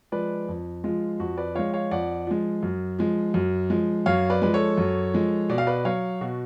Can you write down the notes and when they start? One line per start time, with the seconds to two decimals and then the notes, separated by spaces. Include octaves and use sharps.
0.12 F3 G#3 B4 D5
0.48 F2
0.84 F3 G#3 F4
1.20 F2 F#4
1.38 B4 D5
1.55 F3 G#3 C#5 F5
1.73 C#5 F5
1.91 F2 D5 F#5
2.27 F3 G#3
2.63 F#2
2.99 F3 G#3
3.34 F#2
3.70 F3 G#3
4.06 F#2 C#5 F5
4.30 B4 D5
4.42 F3 G#3 B4
4.54 A4 C#5
4.78 F#2
5.14 F3 G#3
5.49 B2 D5
5.58 F5
5.67 B4 D5
5.85 F#3 C#5 F5
6.21 B2 F#4